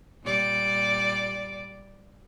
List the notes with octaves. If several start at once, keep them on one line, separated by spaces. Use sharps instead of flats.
A#2 G3 D5